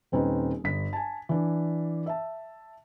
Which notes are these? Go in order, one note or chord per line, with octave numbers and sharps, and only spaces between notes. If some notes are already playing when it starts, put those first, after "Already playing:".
D#1 C4 C#4 D#4 B4
G1 B6
G#5 A5
E3 D4
E5 A5